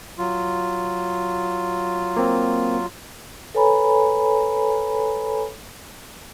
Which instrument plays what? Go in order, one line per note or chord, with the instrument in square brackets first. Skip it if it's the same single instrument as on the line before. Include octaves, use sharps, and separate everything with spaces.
[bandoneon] F#3 F4
[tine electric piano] A#3 C4
[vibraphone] A4 B4 C#5 G#5 A#5 B5